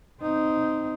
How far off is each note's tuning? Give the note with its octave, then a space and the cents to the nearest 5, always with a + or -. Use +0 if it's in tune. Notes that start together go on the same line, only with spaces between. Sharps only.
C4 -20 D#4 +0